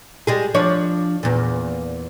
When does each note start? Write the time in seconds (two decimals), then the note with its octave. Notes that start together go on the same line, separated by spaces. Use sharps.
0.27 G3 G#3 G#4
0.54 F3 D4 C#5
1.23 E2 A#2